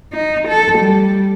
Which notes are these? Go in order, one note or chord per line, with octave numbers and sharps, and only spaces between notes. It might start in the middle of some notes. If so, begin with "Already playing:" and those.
D#4
A4
G3